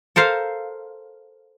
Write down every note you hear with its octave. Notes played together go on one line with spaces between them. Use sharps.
A4 A#4 C5 F5